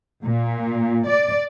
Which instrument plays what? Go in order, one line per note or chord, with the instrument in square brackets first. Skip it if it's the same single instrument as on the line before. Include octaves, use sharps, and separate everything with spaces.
[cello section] A#2
D5